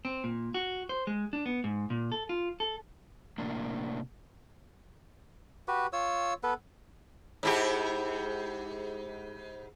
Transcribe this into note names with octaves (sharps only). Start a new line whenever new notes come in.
C4
A#2
F#4
C5
G#3
D4
B3
G#2
A#2
A4
F4
A4
A2 C3 A#3 D4
F#4 G4 B4
F4 C#5 E6
B3 A4 B4
G#2 E4 G4